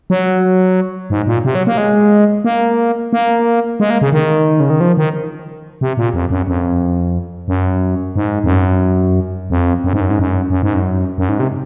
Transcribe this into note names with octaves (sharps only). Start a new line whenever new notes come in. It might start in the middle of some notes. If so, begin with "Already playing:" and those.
F#3
G#2
A#2
C3
F#3
A#3
G#3
A#3
A#3
G#3
A#3
C#3
D#3
C#3
D#3
F3
D#3
C3
A#2
F2
F#2
F2
F#2
G#2
F2
F#2
F2
F#2
G#2
F#2
G#2
F#2
F#2
G#2
F#2
F#2
G#2
C3